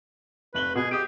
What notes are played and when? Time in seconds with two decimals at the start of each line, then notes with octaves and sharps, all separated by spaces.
0.54 F1 B4 F#7 G7
0.75 B2 G#4
0.91 G4 D#6 D7